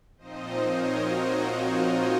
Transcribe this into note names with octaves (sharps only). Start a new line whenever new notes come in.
A#2 F3 C4 D#4 C5 D#5
A#4 C#5
D#4 F#4
F4
D#4